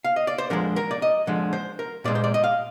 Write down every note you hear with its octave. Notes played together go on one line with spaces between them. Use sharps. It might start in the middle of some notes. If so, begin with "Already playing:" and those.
F5
D#5
D5
C5
D3 F3 G#3 A#4
A#4
D5
D#5
D3 F3 G#3
C5
A#4
A#2 G#3 D5
C5
D5
D#5
F5